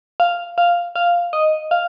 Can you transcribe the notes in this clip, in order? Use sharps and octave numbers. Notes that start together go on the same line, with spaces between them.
F5
F5
F5
D#5
F5